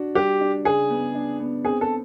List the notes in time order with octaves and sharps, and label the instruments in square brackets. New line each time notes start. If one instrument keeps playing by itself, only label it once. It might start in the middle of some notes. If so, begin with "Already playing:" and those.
Already playing: [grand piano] D4 F#4
[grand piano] G3 [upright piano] G4
[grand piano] D4
[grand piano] C#3 [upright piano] G#4
[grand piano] B3
D4
B3
[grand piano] C4 [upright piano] G#4
[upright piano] A4